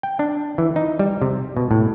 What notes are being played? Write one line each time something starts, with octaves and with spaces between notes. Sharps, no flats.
G5
D4
E3
D#4
G3
C3
B2
A2